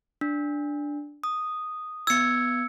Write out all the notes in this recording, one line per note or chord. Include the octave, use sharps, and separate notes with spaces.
D4
D#6
B3 E6 G#6 C#7